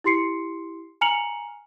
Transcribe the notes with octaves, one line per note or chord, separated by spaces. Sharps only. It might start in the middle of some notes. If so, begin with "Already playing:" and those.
E4 G4 C6 C7 C#7
G#5 A#5 F6 C#7 F7 F#7